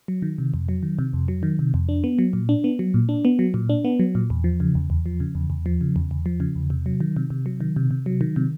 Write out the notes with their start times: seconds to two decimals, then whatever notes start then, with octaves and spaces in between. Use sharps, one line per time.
0.08 F#3
0.22 D#3
0.38 C3
0.54 F2
0.69 F#3
0.83 D#3
0.99 C3
1.13 F2
1.28 F#3
1.43 D#3
1.59 C3
1.74 F2
1.89 D4
2.04 B3
2.19 F#3
2.33 A#2
2.49 D4
2.64 B3
2.79 F#3
2.94 A#2
3.09 D4
3.25 B3
3.39 F#3
3.54 A#2
3.70 D4
3.85 B3
4.00 F#3
4.15 A#2
4.30 E2
4.44 F3
4.60 C#3
4.75 E2
4.90 E2
5.06 F3
5.20 C#3
5.35 E2
5.50 E2
5.66 F3
5.81 C#3
5.96 E2
6.11 E2
6.26 F3
6.40 C#3
6.56 E2
6.70 C3
6.86 F#3
7.00 D#3
7.17 C3
7.30 C3
7.46 F#3
7.61 D#3
7.76 C3
7.91 C3
8.06 F#3
8.21 D#3
8.36 C3